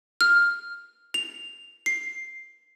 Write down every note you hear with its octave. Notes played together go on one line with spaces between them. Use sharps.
F6
F7
C7